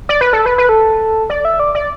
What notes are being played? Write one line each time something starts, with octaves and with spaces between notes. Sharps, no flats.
D5
B4
A4
B4
B4
A4
D5
E5
D5
D5